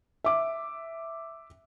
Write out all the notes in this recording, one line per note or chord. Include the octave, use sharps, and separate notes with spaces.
E5 D6